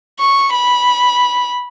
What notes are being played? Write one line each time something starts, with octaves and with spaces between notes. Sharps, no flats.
C#6
B5